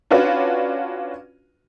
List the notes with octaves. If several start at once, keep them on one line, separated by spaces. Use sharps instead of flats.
C#4 D4 F4 F#4 B4